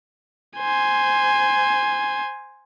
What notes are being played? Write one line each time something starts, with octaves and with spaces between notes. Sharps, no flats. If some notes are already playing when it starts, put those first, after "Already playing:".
C5 G#5